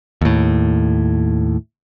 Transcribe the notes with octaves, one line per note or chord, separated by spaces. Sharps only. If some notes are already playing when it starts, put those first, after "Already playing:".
D#2 A2